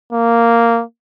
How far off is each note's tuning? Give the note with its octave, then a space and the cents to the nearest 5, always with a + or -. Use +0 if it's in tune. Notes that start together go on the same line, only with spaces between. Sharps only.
A#3 -5